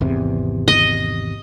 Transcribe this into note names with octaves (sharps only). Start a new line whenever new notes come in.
G#1 E2 C3
D#5